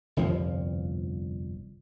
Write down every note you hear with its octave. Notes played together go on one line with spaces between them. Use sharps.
G1 C2 F2 F3